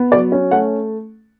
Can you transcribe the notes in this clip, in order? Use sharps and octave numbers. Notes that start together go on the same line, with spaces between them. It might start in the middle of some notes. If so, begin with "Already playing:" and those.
Already playing: B3
F#3 D5
C#4
A3 F#5